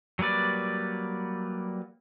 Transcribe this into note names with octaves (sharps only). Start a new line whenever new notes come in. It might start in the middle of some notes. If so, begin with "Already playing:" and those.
F#3 G3 A#3 B4 D5